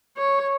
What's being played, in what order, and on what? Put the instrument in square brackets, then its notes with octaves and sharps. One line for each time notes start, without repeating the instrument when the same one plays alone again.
[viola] C#5